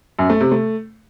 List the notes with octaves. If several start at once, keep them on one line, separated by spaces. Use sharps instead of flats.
F#2
A3
C3
A3